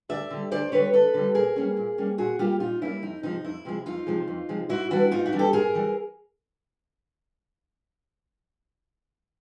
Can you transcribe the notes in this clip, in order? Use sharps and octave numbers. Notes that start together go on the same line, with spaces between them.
D2 D5 E5
D3 G3
D2 C5 D5
D3 G3 B4 C#5
D2 A4 B4
D3 G3
A#2 G#4 A#4
G3 A#3 C#4
A#2
G3 A#3 C#4
A#2 F#4 G#4
G3 A#3 C#4 F4 G4
A#2 D#4 F4
G3 A#3 C#4 E4
F2 D#4
C3 F3 G#3 D#4
F2 E4
C3 F3 G#3
F2 D#4 F4
C3 F3 G#3
F2
C3 F3 G#3
G#2 E4 F#4
E3 G3 B3 D4 E4 F#4
G#2 D#4 F4
E4 F#4
E3 G3 B3 D4
G4 A4
G#2 G#4 A#4
E3 G3